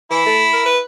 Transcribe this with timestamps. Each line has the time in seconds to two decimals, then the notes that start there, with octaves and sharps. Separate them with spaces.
0.11 E3 E4
0.26 A3
0.53 A#4
0.66 B4